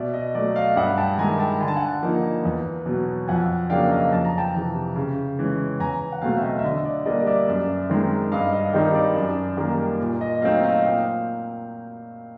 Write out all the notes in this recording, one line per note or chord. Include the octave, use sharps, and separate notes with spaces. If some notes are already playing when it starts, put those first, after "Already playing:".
Already playing: B2 D5 E5
D#5
F#3 A3 D5
D#5 F5
G2 E5 F#5
G5 A5
D#3 G#3 G#5 A#5
G5 A5
D3 G#5
A5
F#5 G#5
F3 A#3 D#4
E2
B2 F#3
F2 F#5 G#5
C#3 F#3 A#3 D4 F5 G5
D#5 F5
F2 A5
A#5
G5 A5
C3 E3
C#3
E3 G#3 C#4
E2 G#5 A#5
F#5
B2 F#3 A3 C4 F5 G5
E5
D#5 F5
E5
D3 D#5
D5
G3 A#3 D4 D#5
D5 E5
F#2
D#3 G#3 C4 D#4
G2 D#5 F5
D#5 F5
D#3 G3 C4 D#4 D#5
D5
F#2
D#3 G3 A#3
A#2
D#5
F#3 A3 C4 D#4 D#5 F5
D#5 F5
A#2 F5 G5